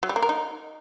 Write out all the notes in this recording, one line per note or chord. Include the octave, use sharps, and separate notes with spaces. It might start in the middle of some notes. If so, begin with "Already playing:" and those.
F#3
G3
A#3
A#4
D#4